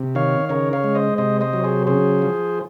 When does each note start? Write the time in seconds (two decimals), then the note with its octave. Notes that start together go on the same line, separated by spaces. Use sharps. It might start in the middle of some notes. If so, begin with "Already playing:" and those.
Already playing: C3
0.15 D#3 C#5 F5
0.49 C#3 A#4 C#5
0.73 C#5 F5
0.84 G#3
0.95 C5 D#5
1.18 C3 C5 D#5
1.41 C5 D#5
1.53 F#3
1.64 G#4 C5
1.87 C#3 G#4 C5
2.22 F3